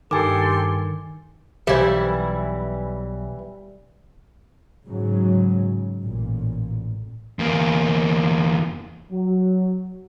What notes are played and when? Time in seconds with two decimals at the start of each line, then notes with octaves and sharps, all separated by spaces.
0.11 G2 D#3 G4 A4 G#5 A5 C6 D6
1.67 B1 E3 G3 E4 G4 C5
4.88 G#2 C#3 F#3
6.03 A1 A#2
7.39 E2 A#3
9.11 F#3